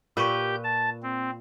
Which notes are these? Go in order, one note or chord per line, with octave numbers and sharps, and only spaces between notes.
A#2 G4 A#4 B4 C#6 G6
A5
C4